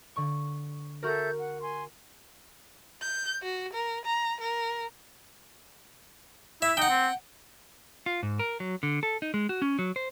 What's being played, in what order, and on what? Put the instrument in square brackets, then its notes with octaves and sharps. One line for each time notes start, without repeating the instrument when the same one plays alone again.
[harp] D3 C#6
[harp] F#4 A#4 [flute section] A4 E5 G6
[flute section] F#5
G#5 C6
[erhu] G6
F#4
A#4
A#5
A#4
[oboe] E4 [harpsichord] E5
[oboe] D#4 [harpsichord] F#5 G5
[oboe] C4
[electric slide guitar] F4
G#2
A#4
F#3
D3
A4
D#4
G#3
F#4
C#4
F#3
C5